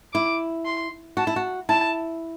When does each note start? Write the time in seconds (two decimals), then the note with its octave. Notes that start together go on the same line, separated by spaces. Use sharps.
0.14 E4 D6
0.65 C6
1.17 F#4 A5
1.27 E4
1.36 F#4
1.69 E4 A5